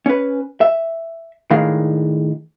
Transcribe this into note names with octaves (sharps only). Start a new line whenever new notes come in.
C#4 B4
E5
A2 D#3 G#3 D4 F5